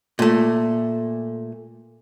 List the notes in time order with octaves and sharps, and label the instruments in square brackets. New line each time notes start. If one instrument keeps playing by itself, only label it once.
[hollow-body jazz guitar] A#2 A3